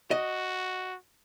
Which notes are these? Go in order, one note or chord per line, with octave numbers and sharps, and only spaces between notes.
F#4 D#5